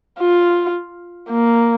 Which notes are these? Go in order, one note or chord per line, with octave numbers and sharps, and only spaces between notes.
F4
A#3